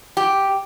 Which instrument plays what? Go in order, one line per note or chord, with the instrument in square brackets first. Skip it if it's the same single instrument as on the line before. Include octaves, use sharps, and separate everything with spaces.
[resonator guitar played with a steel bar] G4